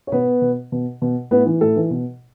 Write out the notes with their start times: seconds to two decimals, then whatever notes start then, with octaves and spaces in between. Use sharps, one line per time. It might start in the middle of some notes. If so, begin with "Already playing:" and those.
0.07 C#5
0.12 B2 B3 B4
0.42 B2
0.72 B2
1.02 B2
1.31 A2 B3 B4
1.46 E3
1.61 A2 A4
1.76 E3
1.91 B2